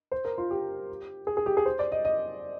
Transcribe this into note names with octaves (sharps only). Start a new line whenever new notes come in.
C5
A#4
F4
G4
G#4
G#4
G4
G#4
C5
D5
D#5
D#5